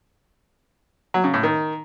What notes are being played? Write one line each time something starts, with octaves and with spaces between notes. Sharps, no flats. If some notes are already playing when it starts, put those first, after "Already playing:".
F#3
C#3
A2
D#3